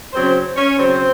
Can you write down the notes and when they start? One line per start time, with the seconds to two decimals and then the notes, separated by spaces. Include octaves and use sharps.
0.13 C#3 F#3 C4 C#4 C5
0.56 C#4 C#5
0.77 C#3 F#3 C4 C#4 C5